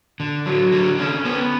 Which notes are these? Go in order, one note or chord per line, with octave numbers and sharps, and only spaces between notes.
D3
F#3
D3
C#4
B3